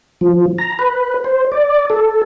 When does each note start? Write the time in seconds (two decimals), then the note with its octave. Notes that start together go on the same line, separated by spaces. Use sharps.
0.21 F3
0.58 A#5
0.79 B4
1.24 C5
1.52 D5
1.90 A4